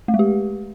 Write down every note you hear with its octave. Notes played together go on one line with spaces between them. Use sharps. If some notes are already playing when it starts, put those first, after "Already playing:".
A3
G#3
G4